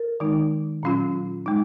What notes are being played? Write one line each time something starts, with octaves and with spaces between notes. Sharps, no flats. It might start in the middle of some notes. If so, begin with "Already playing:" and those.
Already playing: A#4
D#3 G#3 D#4
A#2 F#3 C#4 F4
G#3 D#4